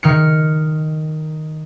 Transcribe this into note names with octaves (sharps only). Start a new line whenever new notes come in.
D#3 F6 C#7